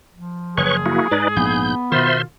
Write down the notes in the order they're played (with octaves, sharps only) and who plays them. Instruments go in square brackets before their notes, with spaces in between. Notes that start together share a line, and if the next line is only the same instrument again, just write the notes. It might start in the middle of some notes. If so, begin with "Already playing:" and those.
[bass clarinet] F3
[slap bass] F#1 [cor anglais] G#4 [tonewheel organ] B4 C#5 C#6
[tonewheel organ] A#3 E4 F#4
[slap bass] G#2 [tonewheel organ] D#4 B4 D5
[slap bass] A#1 [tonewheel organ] G#2 G6 [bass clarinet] B3
[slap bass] B2 D#3 [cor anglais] F4 [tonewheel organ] C5 E5 C6